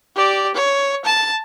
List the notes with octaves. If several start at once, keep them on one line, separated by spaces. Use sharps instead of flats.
G4 D5
C#5
A5